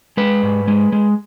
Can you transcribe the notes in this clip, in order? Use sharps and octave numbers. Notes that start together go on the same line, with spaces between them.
G#3 B4
G#2
G#3
G#3